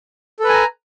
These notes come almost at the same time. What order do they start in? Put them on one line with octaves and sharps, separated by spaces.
A4 B4 G#5 A#5